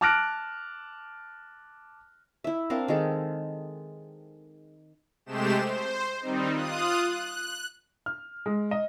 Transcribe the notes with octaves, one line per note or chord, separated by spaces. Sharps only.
A5 D6 F6 F#6 A#6 D7
E4 E5
C4 D4 A#4 F5
D#3 G#3 G#4 A4
C3 G#3 A3 G4 C5 E7
C5
D#3 G3 C4 D#4
F4 D#6 F#6
F#6
F6
G#3
D#5